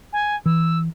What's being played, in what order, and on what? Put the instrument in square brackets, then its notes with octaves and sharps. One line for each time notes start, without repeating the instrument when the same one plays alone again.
[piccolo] G#5
[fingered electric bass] E3 [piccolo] E6